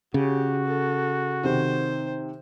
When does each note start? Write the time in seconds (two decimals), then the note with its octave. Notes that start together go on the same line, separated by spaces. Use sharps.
0.14 C#3 F#4 G4
0.66 A4
1.44 C3 D#3 C5